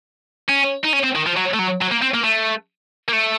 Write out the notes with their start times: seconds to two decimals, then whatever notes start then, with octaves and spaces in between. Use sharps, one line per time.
0.49 C#4
0.84 D#4
0.93 C#4
1.03 C4
1.15 D#3
1.26 F3
1.37 F#3
1.54 A3
1.59 F#3
1.81 F#3
1.91 A#3
2.02 C4
2.14 A#3
2.24 A3
3.08 A#3
3.12 A3